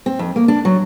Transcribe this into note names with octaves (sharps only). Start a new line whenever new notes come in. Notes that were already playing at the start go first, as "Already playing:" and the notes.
C4
F2
A#3
D4
F#3